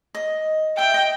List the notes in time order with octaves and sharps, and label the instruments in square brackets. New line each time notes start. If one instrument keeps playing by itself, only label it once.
[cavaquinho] D#5
[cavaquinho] E5 [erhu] G5
[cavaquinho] D#5